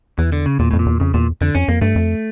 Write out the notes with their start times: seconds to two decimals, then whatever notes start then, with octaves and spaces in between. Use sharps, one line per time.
0.18 E2 E3
0.32 D3
0.46 C#3
0.59 E2 A#2
0.71 F2 A2
0.79 A#2
0.86 E2
1.00 F2 C#3
1.14 E2 A#2
1.41 F2 D3
1.55 F2 C#4
1.68 F2 A#3
1.81 G2 A3
1.96 F2